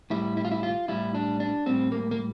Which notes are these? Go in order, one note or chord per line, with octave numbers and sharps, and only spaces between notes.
A2 G3 E4
E4
F4
E4
F4
A2 G3 E4
D4
D4
A2 G3 C4
A#3
A#3